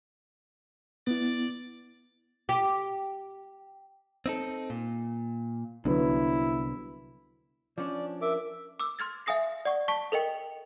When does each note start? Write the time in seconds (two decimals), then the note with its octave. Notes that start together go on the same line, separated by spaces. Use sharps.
1.07 B3 E4 D5
2.49 G4
4.26 C4 D#4 A4
4.70 A#2
5.85 C2 D3 F#3 B3 E4
7.78 F3 C#4 D4 D5
8.22 A#4 E5 D6
8.80 D6 E6
8.99 C6 F6 G#6 A6
9.26 E5 F5 G#5 D#6 A#6 C7
9.65 D5 F#5 C#6
9.88 A5 C#6 B6
10.12 A4 A#4 D#5 G5